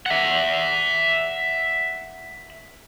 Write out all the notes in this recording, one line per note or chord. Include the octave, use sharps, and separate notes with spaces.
E5 F#5